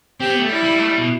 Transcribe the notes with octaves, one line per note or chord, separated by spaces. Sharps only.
C4 G4
B3
A3
G3 E4
G3
A3
G3
B2